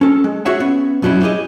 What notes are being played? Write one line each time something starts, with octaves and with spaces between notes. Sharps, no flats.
C#4 A4
G#3
F#4 G#4 C#5 E5 F#5
B3 C#4
F2 B2 F#3 G3 C#4 E4
E4 G4 G#4 D#5